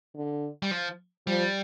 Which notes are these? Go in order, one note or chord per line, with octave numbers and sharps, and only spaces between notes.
D3
G3
F3
F3 G3